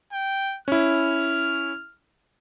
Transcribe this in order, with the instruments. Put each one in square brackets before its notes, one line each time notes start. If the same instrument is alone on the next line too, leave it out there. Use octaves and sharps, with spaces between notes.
[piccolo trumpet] G5
[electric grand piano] C#4 E4 [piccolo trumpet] F6